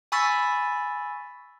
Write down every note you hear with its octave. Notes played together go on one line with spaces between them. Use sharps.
G#5 B5 C#6 E6 A6 B6